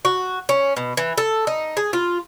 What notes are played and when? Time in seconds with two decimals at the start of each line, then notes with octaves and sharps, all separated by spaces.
0.05 F#4
0.49 C#4
0.77 B2
0.97 E3
1.18 A4
1.47 D#4
1.77 G#4
1.93 F4